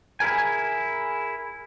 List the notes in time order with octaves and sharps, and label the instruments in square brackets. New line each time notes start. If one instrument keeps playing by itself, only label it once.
[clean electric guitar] E4 G#4 A#4 G#5